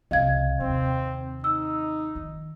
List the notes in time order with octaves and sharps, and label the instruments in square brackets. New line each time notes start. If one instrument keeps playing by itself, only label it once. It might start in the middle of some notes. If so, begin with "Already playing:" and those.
[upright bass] C2 C#3 [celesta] D#5 F5 G#6
[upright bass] D#2 C3 [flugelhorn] C4
[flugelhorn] D#4 [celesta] E6
[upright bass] D#3